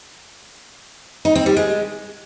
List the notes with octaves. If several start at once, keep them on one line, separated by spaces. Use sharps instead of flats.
D#4
C4
G3
G#3